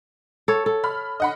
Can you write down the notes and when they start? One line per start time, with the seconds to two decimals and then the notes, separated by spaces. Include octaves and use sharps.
0.48 A4 C#5
0.66 A4
0.84 B5 F6
1.20 D#5 F#5 B5